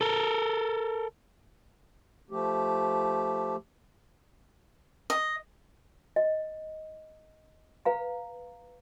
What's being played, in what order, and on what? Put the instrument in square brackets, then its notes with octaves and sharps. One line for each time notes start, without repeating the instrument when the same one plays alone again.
[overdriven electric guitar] A4 A#4
[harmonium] F3 A3 G4
[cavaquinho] D#5
[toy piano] D#5
B4 F5 A#5